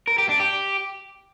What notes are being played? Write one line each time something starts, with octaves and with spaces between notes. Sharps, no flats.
A#4
G4
D4
G4